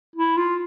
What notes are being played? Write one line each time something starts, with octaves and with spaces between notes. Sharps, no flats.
E4
F4